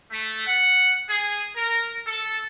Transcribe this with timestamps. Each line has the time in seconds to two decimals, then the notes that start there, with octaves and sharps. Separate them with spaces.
0.12 A3
0.47 F#5
1.10 G#4
1.57 A#4
2.06 A4